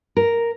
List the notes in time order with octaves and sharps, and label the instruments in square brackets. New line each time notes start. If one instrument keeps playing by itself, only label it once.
[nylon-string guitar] A#4